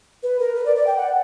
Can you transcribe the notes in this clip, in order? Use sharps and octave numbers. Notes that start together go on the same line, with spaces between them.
B4
A#4
B4
D5
D5
G5
F#5